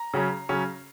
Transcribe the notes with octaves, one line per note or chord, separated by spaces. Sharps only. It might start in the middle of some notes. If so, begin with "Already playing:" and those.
Already playing: A#5
C#3 F#3 C#4
C#3 F#3 C#4